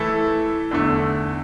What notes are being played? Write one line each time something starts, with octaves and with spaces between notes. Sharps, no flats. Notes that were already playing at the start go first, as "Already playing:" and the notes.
Already playing: E3 A3 E4 A4
E2 D3 A3